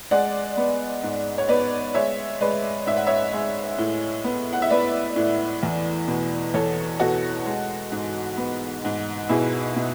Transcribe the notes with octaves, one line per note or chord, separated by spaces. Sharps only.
G#3 D5 F#5
B3
G#2
C#5
B3 B4 D5
G#3 C#5 E5
G#3 B4 D5
G#2 E5
F#5
C#5 E5
G#3
A2
B3
F#5
E5
B3 B4 D5
A2
E2
B2
E2 A4 C#5
B2 F#4 A4
G#3
G#2
B3
G#2
B2 E4 G#4
B2